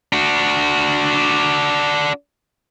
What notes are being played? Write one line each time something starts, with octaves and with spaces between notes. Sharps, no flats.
D4 F#4